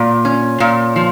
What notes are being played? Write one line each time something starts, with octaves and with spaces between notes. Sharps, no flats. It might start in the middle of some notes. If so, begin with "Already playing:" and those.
Already playing: A#2
C#4
A#2
F3